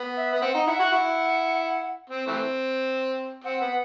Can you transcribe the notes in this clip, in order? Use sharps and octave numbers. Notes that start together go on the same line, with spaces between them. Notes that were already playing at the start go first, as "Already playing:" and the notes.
Already playing: B3
E5
B3
C4 F#5
D#4
E4 F#5
F#4 F#5
E4
C4
E3 A3 C4
C4 F#5
B3